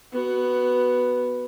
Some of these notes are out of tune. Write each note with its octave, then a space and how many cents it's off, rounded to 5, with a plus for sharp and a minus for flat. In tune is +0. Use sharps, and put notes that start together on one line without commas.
B3 +0 F#4 +10